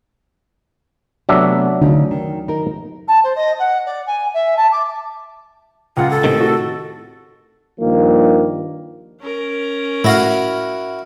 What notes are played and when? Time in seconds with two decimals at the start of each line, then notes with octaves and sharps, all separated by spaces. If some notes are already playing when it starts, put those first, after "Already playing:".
1.29 C3 F#3 A3 B3 D4 E5
1.82 D2 C#3 D#4
2.11 D#3
2.48 D#4 A#4
3.07 A5
3.23 C5
3.35 D#5
3.59 F#5
3.85 D5
4.06 G#5
4.33 E5
4.56 A5
4.71 D6
5.97 C#2 F4 F#5
6.11 A4
6.24 A2 C3 D#3
6.40 F#4
7.80 G2 D#3 F3 A#3
9.21 C#4 A#4
10.04 A2 E4 F#4 F5 A#6